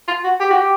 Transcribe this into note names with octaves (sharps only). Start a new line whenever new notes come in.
F4
F#4
G4
F#4
G4